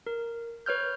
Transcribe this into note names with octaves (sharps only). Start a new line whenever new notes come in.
A#4
B4 C#5 F6 G6